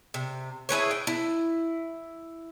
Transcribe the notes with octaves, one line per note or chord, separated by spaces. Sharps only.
C3
E4 G#4 B4 C#5
G5
E4